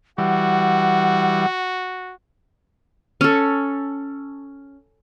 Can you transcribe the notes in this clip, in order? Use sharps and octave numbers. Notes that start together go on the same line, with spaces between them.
E3 G3 F#4 F#5
C#4 A4